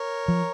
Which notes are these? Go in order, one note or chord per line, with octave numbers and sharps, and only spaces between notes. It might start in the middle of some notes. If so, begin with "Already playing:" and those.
Already playing: A#4 C#5
F3